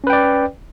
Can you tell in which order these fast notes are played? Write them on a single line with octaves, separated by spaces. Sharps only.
C#4 B4 G5 D5